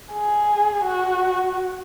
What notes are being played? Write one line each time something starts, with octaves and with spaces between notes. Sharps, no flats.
G#4
F#4